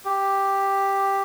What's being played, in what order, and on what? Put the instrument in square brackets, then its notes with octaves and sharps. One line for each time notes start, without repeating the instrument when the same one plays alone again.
[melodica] G4